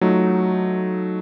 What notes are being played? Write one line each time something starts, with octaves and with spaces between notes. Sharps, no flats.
F#3 A3 D#4 F4